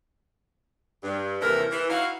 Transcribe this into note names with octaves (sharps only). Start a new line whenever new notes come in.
G2
D#2 C3 E3 E4 A4 A#4
E3
D#4 E4 F#4 F5